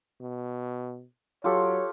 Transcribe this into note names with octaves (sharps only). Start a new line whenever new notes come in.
B2
F#3 F4 G4 A4 C#5